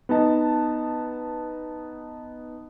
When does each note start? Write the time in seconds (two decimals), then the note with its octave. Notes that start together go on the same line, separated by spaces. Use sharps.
0.09 B3 D#4 A5